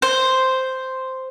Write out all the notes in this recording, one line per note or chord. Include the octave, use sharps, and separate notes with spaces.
C5